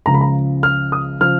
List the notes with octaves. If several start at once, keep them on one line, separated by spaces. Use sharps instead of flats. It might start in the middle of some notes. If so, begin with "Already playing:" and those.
C#2 C#3 F3 A#5
B5
A#5
F6
D#6
C#3 F3 F6